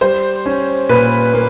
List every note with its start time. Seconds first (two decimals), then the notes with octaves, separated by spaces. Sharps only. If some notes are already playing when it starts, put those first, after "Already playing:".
0.01 G3 C5
0.46 C#4
0.89 A#2 B4
1.34 A#3